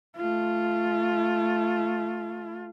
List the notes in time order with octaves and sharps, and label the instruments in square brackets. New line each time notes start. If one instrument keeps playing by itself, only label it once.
[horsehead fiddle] A3 F4